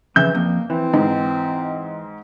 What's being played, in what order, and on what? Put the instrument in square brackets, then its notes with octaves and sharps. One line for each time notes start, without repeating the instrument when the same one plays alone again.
[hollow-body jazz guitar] F2 C#3 E5 [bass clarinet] E3 [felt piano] G6
[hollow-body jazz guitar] F2 [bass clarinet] A#3
[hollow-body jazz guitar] E3 [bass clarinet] C4
[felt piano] G#2 D#4